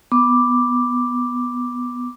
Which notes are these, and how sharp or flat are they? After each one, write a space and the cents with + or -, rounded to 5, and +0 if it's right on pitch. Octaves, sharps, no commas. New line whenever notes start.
B3 +0 D6 +0